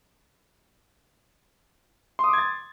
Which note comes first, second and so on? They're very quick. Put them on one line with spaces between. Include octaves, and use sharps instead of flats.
C6 D#6 D6 G#6 A6